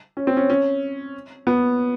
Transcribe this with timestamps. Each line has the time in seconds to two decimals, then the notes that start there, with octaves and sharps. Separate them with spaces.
0.17 C#4
0.27 C4
0.37 C#4
0.50 C#4
1.47 B3